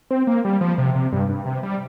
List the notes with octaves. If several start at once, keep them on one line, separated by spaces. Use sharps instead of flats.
C4
A#3
G3
F3
C3
C3
G2
G2
C3
G3